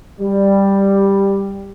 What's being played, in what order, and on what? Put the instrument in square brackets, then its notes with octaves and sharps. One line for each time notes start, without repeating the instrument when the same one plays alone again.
[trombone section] G3